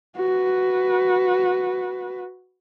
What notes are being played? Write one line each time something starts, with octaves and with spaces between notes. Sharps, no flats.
F#4 B4